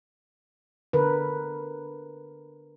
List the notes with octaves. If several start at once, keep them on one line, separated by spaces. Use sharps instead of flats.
D3 A#4 B4